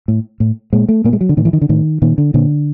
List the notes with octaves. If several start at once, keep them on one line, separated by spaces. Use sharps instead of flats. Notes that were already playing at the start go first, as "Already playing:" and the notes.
A2
A2
A#2 G#3
A3
A#2 A#3
G#3
F#3
D3
A2 D#3
E3
D#3
D3
A2 D#3
A#2 D#3
D3
A#2 D3